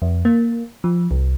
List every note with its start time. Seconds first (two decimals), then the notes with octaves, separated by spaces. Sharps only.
0.02 F2
0.25 A#3
0.84 F3
1.11 C2